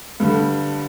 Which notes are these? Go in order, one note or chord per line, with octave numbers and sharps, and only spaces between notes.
G2 D3 G3